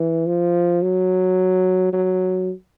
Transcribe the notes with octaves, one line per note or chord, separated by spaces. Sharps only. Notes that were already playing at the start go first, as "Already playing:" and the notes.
Already playing: E3
F3
F#3
F#3